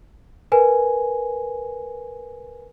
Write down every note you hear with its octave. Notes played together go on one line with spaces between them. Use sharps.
A#4 B4 G#5